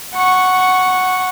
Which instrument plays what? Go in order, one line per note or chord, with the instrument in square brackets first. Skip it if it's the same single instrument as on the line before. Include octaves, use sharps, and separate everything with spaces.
[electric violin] F#5 C#6